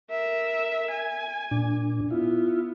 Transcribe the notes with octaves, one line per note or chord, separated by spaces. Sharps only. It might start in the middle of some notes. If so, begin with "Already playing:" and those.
A#4 E5
G#5
A#2 D4
B3 E4 F4